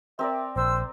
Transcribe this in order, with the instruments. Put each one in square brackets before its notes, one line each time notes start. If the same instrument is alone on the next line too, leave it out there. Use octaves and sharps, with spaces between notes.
[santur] C4 A#4 D5 [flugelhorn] E5
[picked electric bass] A#1 [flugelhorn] C5 [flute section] E6